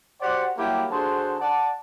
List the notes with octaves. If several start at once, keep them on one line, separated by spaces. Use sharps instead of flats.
F#4 G4 C5 D5 F#5
F#3 G3 A#3 E4 G4
D3 F#4 G#4 C5 A5 C6
D5 F#5 A5